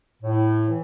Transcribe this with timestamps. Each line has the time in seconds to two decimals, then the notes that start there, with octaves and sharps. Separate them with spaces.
0.22 A2
0.69 E3